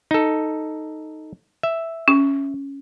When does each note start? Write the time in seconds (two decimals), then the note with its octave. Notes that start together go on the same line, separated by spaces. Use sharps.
0.11 D#4 A4
1.63 E5
2.08 C#4